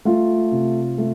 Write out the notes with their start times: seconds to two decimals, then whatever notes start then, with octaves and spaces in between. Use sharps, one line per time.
0.05 A3 F4
0.52 C3
0.98 A3